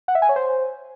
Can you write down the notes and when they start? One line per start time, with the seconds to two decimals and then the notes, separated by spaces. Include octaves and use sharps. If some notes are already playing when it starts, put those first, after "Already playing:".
0.08 F#5
0.15 E5
0.22 G#5
0.29 C#5
0.36 C5